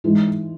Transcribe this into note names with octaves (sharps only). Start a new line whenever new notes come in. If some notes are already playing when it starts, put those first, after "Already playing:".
E3 G#3 D#4